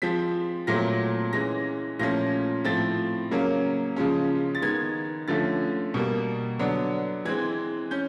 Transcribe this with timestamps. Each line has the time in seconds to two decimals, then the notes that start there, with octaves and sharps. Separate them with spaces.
0.02 F3 G#3 C4 B6
0.67 A#2 F#3 A3 C4 A#6
1.33 E3 G#3 C#4 A#6
1.99 A#2 F3 A3 C#4 A#6
2.64 A2 F3 A3 C4 A6
3.31 C#3 F#3 A#3 C#4
3.96 C#3 F3 G#3 C#4
4.55 A6
4.62 D#3 G#3 B3 G#6
5.28 D3 F3 A3 C#4 A6
5.94 B2 G3 A#3
6.59 D3 F#3 B3 D4
7.25 E3 G#3 C4 G#6
7.91 C#4 G6